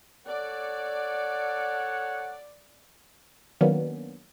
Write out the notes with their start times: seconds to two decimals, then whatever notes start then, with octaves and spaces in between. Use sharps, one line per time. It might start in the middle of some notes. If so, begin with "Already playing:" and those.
0.26 A4 C#5 D5 F#5
3.61 D#3 F#3 A#3 B3 C#4 D4